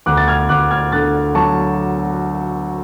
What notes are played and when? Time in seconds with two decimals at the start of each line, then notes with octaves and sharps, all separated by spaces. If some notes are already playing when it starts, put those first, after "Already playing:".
0.06 D2 D6 F#6
0.17 A6
0.28 F6 G#6
0.49 D2 D6 F#6
0.71 F6 G#6
0.92 D3 F#6 A6
1.35 F#3 A5 C#6